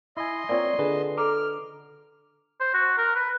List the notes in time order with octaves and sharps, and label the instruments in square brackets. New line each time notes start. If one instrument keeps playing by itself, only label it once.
[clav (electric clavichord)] E4 G#5 [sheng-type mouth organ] D#5 C6
[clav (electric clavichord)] A#3 C4 C#5 [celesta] F4 D5
[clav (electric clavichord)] D3 [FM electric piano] G#4 B4
[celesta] A4 A#5 [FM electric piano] D6 [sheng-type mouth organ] F6
[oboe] C5
F#4
A#4
B4